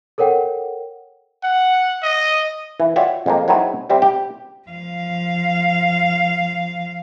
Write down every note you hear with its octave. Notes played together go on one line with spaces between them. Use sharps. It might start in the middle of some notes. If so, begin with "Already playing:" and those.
A4 A#4 C#5 F#5 G5
F#5
D#5
E3
F4 F#4 C#5 D5 E5 G5
F2 G#3 A#3
F#3 C4 D#4 E4 G#4
G3 C4 G4 E5
G4
F3 F5